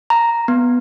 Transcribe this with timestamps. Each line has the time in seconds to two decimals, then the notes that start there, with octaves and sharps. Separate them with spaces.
0.10 A#5
0.48 B3